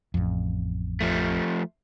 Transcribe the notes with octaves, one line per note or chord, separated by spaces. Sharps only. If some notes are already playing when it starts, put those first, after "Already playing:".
A1 F2
F3 A3